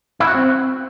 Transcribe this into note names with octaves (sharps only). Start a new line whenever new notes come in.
E4
F#4
C4